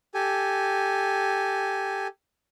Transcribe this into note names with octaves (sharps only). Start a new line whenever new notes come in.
G4 A4 G#5